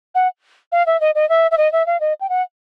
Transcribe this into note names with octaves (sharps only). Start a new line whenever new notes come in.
F#5
F5
E5
D#5
D#5
E5
E5
D#5
E5
F5
D#5
G5
F#5